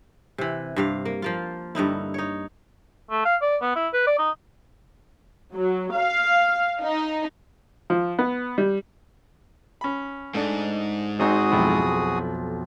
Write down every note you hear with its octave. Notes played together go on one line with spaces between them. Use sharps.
C3 E3
G2 C3 F5
A#3
F3 A#3 F4
G2 D3 D#4 E4
D#4 C#5
A3
F5
D5
B3
E4
B4
D5
D#4
F#3
F5
D#4
F3
B3
G3
C#4 B5
G#2 A3 D4
G#1 C4 D#4 F#4 G#4 D#6
B1 F2 E4